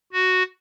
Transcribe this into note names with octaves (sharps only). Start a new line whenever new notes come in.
F#4